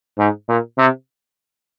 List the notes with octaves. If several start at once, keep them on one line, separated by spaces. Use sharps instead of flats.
G#2
A#2
C3